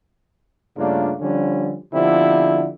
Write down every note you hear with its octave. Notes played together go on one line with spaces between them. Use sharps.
G2 C#3 A3 A#3 D4 F4
D3 F3 G3 C#4 D4
B2 D3 F3 C4 E4 G4